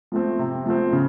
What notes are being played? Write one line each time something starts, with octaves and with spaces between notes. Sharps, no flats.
F3 A3 C4
C3
F3 A3 C4
C#3